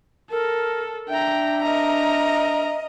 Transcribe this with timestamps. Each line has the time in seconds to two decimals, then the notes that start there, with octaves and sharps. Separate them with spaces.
0.31 A4 A#4
1.09 D4 E5 G5 A#5
1.62 A#4 D#5 A#5